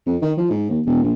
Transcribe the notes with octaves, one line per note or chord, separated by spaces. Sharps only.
F2
D#3
F3
G#2
D#2
E1
A#1